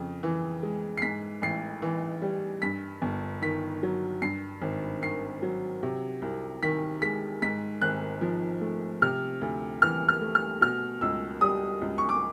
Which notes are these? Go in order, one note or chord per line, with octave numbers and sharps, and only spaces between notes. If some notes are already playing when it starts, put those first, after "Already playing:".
Already playing: F2 C#3
E3
G#3
C7
G#2 B6
A1 C7
E3
G3
G2 B6
G1
D#3 B6
F#3
G2 C7
G#1
D#3 C7
F#3
C3
C2
D#3 B6
G#3 B6
G#2 B6
G#1 F#6
F3
A3
C3 F6
D2
E3 F6
F6
A3
F6
B2 F6
C#2 E6
G3 D#6
C#2
C#6
D6